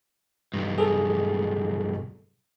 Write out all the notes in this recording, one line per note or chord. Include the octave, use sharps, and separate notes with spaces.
B1 G2
G#4 A4